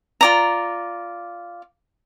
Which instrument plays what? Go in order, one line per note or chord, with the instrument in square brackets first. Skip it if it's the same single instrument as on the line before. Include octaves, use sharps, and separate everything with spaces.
[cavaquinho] F4 D5 A#5